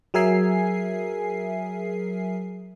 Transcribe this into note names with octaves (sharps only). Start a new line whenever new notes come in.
F#3 G#4 A#4 E5 G#5 C7